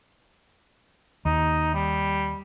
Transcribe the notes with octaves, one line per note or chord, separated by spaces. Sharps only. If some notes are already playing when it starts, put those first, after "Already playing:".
D#2 D#4
G3